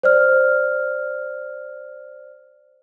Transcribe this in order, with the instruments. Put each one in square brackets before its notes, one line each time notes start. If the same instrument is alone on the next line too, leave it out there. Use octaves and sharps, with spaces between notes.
[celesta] C5 D5 F6